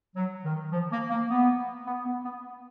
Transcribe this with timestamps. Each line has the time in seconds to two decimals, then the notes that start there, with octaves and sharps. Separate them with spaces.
0.16 F#3
0.44 D#3
0.72 F3
0.92 A#3
1.10 A#3
1.30 B3
1.86 B3
2.05 B3
2.24 B3